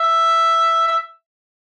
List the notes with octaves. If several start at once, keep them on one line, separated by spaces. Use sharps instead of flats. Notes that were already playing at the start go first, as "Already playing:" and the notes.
Already playing: E5
E5